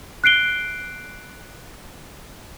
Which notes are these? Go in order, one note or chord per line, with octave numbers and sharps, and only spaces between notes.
F#6 C7 D7 G7